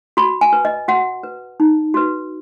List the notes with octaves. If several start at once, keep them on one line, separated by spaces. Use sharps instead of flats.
F#4 B5
G#5
B4
D#5
F#4 F#5
B4
D#4
F#4 B4